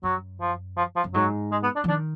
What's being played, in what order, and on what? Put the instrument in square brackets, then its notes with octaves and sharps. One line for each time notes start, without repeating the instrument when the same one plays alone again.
[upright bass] F#2 [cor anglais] F#3
[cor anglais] F3
F3
F3
[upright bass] F#2
[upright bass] G#2 [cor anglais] F#3
[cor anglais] G#3
B3
D4
[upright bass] F3
[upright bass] D#3 [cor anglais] D4